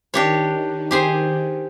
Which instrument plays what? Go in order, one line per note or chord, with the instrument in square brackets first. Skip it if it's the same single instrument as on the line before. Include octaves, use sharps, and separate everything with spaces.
[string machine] D#3 [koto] D4 G4 C#5
[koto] G4 G#4 C5